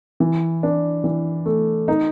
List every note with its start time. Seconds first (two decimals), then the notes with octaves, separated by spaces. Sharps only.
0.20 E3
0.63 D4
1.04 E3
1.46 A3
1.88 D#4